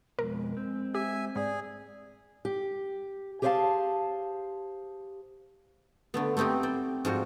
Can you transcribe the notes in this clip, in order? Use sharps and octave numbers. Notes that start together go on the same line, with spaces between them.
F2 B2 G#3 A#4
C4
G4 E5 G#5
G#2 G#4 D5
G4
G4 G#4 C5 C#5 F5 A5
D3 A3 B3
A3 B3 C4 D#4 G4
C5 D5 G5
G#2 F3 G3 F#4